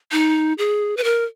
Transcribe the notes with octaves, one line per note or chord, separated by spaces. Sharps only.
D#4
G#4
B4
A#4